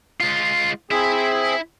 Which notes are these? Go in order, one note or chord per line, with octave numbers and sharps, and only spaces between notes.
G#3 F4
C4 E4 G#4 E5